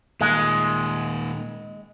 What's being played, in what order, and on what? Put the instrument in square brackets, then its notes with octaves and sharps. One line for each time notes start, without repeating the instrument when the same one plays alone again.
[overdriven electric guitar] A#2 D#3 [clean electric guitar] G#3